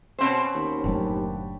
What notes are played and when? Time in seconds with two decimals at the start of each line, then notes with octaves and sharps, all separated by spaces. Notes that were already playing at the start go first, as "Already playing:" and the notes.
0.19 B2 C4 C#4 C5 B5
0.55 D#2
0.84 F#1 A2 F#3 D4 G4